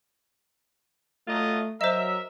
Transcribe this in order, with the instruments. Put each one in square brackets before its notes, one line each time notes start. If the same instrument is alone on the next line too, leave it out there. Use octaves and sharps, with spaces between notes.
[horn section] F#3 F4 D#5 [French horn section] A3
[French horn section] F#3 [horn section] A#4 E5 [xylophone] C5 D#5